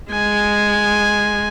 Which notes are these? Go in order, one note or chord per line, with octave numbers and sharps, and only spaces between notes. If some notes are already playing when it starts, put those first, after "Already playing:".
G#3 G#5